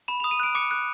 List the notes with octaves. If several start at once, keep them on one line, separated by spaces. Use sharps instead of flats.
B5 E7
D#6 F7
D#7
F#6 D7
D6 C#7
F#6